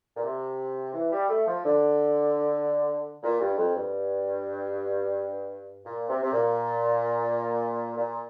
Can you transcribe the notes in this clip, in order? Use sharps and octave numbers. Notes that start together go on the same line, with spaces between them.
A#2
C3
E3
G3
A3
F3
D3
A#2
G2
F2
G2
A#2
C3
C3
A#2
A#2